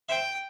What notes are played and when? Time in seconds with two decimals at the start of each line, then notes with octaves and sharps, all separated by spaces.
0.09 C5 E5 G5